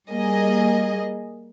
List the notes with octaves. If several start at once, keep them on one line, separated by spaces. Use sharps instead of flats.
G3 A#3 G#4 D#5